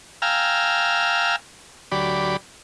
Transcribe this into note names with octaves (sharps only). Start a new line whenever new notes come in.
F5 G5 G#5 A#5 E6 F6
D2 F#3 G4 D5 B5